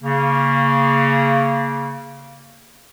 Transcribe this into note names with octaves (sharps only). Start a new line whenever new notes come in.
C#3 A#3